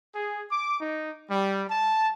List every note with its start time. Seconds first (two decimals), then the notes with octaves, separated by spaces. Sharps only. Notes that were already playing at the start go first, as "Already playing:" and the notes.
0.15 G#4
0.51 D6
0.80 D#4
1.31 G3
1.70 A5